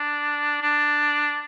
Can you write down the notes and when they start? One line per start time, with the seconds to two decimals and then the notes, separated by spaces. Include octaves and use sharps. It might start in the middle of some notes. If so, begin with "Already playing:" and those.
Already playing: D4
0.62 D4